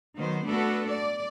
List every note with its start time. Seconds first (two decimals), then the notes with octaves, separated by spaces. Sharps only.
0.17 D#3 F#3 B3 C5
0.47 A3 B3 D4 F#4 A4 B4
0.90 D5